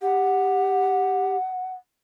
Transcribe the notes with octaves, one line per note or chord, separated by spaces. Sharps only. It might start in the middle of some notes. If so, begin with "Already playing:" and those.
G4 F#5